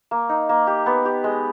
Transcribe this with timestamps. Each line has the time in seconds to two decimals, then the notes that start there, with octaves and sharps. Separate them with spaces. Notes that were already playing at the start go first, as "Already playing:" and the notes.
0.11 A#3
0.29 D#4
0.49 A#3
0.67 G4
0.86 B3
1.05 G4
1.24 G#3